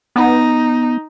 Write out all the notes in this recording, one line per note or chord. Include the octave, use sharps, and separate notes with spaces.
B3 D#4